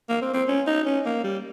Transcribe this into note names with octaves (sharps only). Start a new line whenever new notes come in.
A#3
C4
C4
C#4
D#4
C#4
A#3
G3